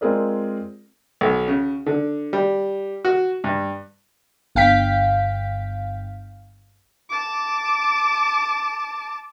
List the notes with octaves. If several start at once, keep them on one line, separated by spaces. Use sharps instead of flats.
G#3 C4 F4 G#4 A#4 D5
B1
C#3
D3
G3
F#4
G2
G1 F5 G5 B6
A5 D6